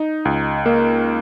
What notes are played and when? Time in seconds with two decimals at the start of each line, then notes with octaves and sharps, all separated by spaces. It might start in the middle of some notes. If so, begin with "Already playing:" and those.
Already playing: D#4
0.25 C#2
0.66 A#3